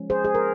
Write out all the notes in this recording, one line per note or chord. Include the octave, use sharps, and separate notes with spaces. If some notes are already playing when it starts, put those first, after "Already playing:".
Already playing: F3 G#3 C#4
G#4 C5
G#4
A#4